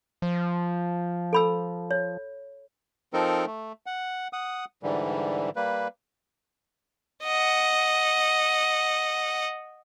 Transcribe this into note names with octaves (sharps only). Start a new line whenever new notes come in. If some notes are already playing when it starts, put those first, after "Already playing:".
F3
A4 B5 E6
C#5
F3 C4 D#4 A4 A#4
A3
F#5
F#5 D#6
G#2 D3 E3 G3
G3 A#3 B4
D#5 F#5